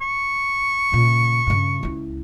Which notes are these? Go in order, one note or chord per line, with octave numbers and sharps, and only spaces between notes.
C#6
A#2 C#3
G2 C#3
C#2 E4